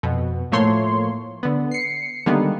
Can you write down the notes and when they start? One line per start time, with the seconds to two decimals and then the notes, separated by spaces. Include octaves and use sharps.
0.03 F2 B2
0.52 A2 F3 A3 A#3 C#5 C6
1.43 D3 B3
1.71 C7 C#7
2.26 D3 D#3 G3 G#3 A#3 B3